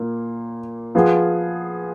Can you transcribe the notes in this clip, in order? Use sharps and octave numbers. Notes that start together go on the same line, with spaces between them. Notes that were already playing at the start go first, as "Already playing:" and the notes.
Already playing: A#2 A#3
F3 B3 F4 G#4